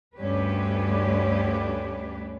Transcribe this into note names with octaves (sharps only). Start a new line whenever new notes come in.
D2 G2 C#4 D4 G4 B4